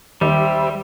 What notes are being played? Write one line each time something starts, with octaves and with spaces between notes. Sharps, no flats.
D#2 D#3 G3 G4 C5 E5